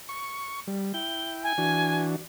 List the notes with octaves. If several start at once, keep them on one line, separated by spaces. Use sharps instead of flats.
C#6
G3
E4 G5 G7
G#5
E3 D4 F#4